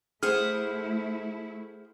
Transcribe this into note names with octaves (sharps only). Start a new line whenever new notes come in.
A3 E4 G#4 C5 F#5 F6